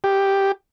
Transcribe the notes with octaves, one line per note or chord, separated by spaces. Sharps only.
G4